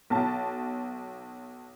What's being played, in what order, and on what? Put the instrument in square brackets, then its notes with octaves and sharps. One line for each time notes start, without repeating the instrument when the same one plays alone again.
[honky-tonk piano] B1 A5